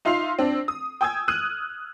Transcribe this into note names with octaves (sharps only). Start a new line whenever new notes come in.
D#4 F4 E5 C6 C7 F7
C4 D4
D#6
G5 G#5 D#6 E6 G#6
D#6 F6 F#6 D#7